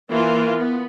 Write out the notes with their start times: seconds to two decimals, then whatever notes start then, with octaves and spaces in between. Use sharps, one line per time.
0.11 E3 A#3 F4 A#4
0.54 B3